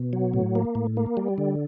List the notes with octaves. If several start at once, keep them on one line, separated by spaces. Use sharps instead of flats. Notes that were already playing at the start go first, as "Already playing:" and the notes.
Already playing: B2
F#3
A2
A#3
A2
A#3
G3
D3